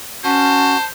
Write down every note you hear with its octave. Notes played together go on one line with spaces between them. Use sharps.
C#4 F#4 C5 A5